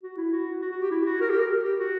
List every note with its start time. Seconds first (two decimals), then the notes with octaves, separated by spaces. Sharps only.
0.03 F#4
0.17 E4
0.32 F#4
0.61 F#4
0.71 F#4
0.81 G4
0.91 E4
1.06 F#4
1.21 A#4
1.30 G4
1.40 A#4
1.64 G4
1.80 F#4